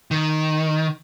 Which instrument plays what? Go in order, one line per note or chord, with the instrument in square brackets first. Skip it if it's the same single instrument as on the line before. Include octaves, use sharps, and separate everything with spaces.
[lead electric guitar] D#3